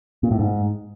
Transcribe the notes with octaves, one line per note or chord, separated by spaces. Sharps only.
A#2
A2
G#2